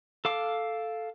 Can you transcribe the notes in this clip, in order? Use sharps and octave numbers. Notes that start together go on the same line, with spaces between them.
A4 F5 D6